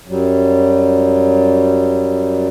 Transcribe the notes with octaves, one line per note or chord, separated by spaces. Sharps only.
F#2 F#3 G3